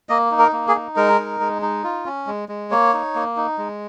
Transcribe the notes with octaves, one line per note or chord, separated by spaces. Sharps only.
A#3 D#5
D#4
A#4
A#3
G#4
D#4
G#3 A#4
D#4
G#3
D#4
F4
C#4
G#3
G#3
A#3 C#5
D#4
A#3
D#4
G#3